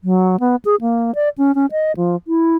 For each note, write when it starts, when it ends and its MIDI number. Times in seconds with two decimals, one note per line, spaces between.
0.04 0.40 54
0.40 0.56 59
0.65 0.76 68
0.81 1.14 58
1.15 1.29 74
1.38 1.54 61
1.55 1.66 61
1.72 1.92 75
1.97 2.16 53
2.28 2.57 64